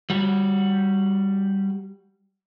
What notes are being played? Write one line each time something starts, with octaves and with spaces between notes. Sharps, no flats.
G3 F#4